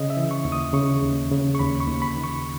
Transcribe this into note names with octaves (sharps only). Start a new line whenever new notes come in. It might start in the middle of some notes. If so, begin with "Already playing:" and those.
Already playing: C#3 D#5
E5
E3
C#6
D#2
D#6
C#3 C#6
D#2
C#3
C#6
D#2 B5
C#6
D#2
B5
D#3
C#6